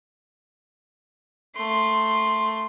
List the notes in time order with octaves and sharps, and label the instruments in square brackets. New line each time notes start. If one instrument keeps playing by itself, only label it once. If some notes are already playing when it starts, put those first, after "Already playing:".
[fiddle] A3 C6